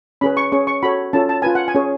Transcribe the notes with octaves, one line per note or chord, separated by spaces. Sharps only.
C#4 G#4 B4 B5
C#6
C#4 G#4 C#5 C#6
C#6
F#4 A4 C#5 B5
C#4 F4 A4 A5
A5
F4 B4 G#5
F#5
G#5
C#4 G#4 C#5